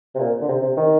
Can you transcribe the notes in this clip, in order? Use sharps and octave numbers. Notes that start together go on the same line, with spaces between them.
C3
A#2
D3
C3
C3
D#3